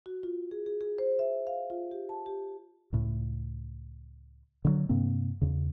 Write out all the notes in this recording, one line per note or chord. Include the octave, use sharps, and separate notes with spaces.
F#4
F4
G#4
G#4
G#4
C5
E5
F5
F4
G4
A5
G4
C#2 A2
D3 E3 F#3
G2 C3 A#3 C4
E2 C#3